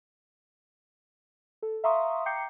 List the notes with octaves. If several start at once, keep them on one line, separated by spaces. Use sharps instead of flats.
A4
E5 F5 A#5 C6 C#6 D#6
G5 A#5 D6 G6 C7 C#7